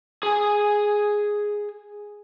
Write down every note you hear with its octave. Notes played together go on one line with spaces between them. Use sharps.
G#4 G#5